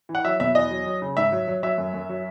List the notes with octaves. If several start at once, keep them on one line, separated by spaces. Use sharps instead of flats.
E3
F#5
F#3 E5
B2 E5
E2 D#5
F#3
F#3
C#3
G#2 E5
F#3
F#3
F#3 E5
F#2
F#2
F#3